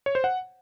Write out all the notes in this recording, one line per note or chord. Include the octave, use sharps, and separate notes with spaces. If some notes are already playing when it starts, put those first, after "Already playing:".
C#5
C5
F#5